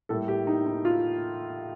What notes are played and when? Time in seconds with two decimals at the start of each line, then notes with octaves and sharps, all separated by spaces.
0.09 A2 G3 A#3 A4
0.28 G4
0.47 D#4
0.66 D#4
0.85 F4